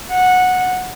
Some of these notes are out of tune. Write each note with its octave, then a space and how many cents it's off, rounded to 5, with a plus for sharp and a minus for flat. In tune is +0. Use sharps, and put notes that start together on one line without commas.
F#5 -15